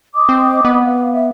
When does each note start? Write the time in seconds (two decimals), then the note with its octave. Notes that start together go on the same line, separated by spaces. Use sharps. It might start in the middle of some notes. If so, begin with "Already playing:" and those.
0.15 D#5 D6 D#6
0.29 C4
0.65 B3
0.84 F5
1.13 E5